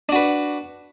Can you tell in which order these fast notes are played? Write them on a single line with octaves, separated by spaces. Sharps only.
D4 F#4 B4